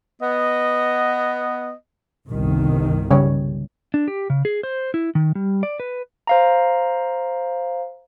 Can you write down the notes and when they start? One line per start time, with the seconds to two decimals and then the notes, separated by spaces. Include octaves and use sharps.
0.22 B3 D#5
2.27 G1 C2 D#3
3.11 C#3 G3 C#5
3.94 D4
4.08 G4
4.30 C#3
4.45 G#4
4.63 C5
4.94 E4
5.15 D#3
5.35 G3
5.63 D5
5.80 B4
6.27 C5 F5 A#5